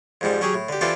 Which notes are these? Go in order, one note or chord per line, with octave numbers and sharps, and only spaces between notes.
F2 G#2 G3
F#3 C#4 G4 G#4
A2
D3 G4
E3 C4 D4 F4 G4 A4